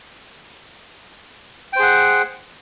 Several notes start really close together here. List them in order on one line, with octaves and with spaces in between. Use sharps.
G5 C5 G#4 F#5